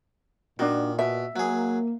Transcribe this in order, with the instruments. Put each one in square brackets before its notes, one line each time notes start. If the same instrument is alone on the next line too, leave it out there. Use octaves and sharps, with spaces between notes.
[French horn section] A#2 [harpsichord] D#3 [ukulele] D4 F#4
[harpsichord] B2 [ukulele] E5
[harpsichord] F#3 G#4 [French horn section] A#3